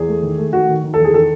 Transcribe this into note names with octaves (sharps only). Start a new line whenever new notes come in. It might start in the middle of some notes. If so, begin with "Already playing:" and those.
Already playing: E2 G#4
A3
D#3
A3
D#3 F#4
D#3
D#3
A4
E2 G#4
D#3 A4